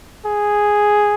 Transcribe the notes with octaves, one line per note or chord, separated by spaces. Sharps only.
G#4